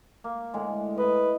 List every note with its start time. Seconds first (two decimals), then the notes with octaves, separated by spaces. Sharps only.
0.24 A#3
0.54 A2 D3 G#3
0.97 E4 A#4 B4 D#5